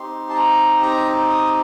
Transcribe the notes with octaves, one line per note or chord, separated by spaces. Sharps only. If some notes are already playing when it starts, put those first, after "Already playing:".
Already playing: C4 D#4 G4 C6
A5
A#5
A#5
D#6